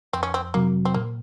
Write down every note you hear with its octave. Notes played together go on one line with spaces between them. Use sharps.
F2 C4
C#4
C4
C3 F#3 A#3
C4
A#2 A#3